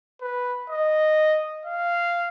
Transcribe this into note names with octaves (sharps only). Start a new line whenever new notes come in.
B4
D#5
F5